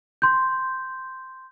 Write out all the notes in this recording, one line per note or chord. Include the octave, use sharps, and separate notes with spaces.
C6 G6